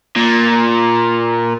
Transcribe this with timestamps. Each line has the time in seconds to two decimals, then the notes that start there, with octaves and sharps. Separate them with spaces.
0.16 A#2